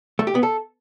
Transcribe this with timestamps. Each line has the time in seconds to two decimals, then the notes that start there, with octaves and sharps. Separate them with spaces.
0.19 A3
0.27 G4
0.35 B3
0.43 A4